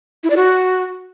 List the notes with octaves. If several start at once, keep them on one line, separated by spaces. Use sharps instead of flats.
E4
D5
F#4